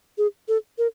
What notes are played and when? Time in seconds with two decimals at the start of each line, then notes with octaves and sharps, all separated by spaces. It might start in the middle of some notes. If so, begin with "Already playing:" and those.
0.18 G#4
0.48 A4
0.78 A#4